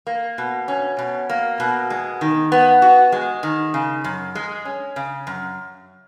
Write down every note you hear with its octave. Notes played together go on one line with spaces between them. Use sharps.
A#3
B2
C#4
B2
A#3
B2
G#3
D#3
B3
F#4
G#3
D#3
C#3
F#2
G#3
C#4
C#3
F#2